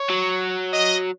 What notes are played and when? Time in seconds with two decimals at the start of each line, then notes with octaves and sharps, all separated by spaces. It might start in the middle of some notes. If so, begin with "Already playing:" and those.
Already playing: C#5
0.10 F#3
0.73 D#5